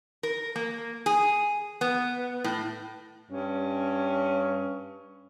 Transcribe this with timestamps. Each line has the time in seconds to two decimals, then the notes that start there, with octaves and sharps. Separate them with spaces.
0.23 A#4
0.56 A#3
1.06 G#4
1.81 B3
2.44 A2
3.31 G2 C#4